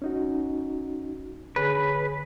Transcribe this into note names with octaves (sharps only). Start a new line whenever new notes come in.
C#4 D#4 F#4
D3 G#4 B4 C#5